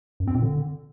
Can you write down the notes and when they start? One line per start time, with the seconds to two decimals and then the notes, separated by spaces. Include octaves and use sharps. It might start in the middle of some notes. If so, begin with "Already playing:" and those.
0.20 F#2
0.27 C4
0.35 A#2
0.42 D3